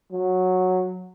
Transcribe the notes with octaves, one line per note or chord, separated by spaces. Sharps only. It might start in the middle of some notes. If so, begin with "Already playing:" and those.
F#3